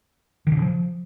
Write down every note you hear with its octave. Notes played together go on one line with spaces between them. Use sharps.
D#3
D3
C#3
F3